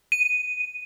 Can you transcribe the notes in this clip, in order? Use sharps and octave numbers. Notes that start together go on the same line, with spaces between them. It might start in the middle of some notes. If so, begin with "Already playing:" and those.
D#7